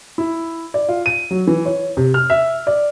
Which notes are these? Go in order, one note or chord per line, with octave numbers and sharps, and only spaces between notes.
E4
D5
F4
D#7
F#3
E3
C#5
C3
F6
E5
D5